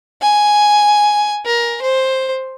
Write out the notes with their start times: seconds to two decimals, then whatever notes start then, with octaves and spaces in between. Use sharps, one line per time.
0.22 G#5
1.46 A#4
1.82 C5